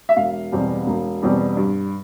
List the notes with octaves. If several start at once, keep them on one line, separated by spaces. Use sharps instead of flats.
E5
E1 F5
E2 B2 G3 C4
E1
E2 B2 G3 C4
G2